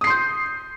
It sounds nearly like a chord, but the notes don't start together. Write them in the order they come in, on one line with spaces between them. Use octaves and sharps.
D#6 C7 C6 G6